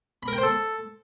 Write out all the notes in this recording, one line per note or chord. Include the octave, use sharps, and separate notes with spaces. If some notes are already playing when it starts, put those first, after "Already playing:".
B5
A#4
G5
C5
A4